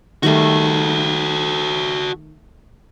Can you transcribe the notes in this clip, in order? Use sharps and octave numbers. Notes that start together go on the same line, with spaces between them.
D#3 G3 A3 F#4 A4